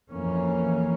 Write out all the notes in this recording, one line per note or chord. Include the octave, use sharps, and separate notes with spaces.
F2 E3 A#3 C#4